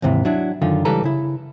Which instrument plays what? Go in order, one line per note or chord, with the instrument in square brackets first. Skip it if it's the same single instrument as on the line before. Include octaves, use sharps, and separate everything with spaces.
[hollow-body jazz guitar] D#2 G#2 C3 E3
F#3 D4 E4
F#2 D3 D#3 F4
C#2 E3 G3 A4 B4 A#5
C#3 E4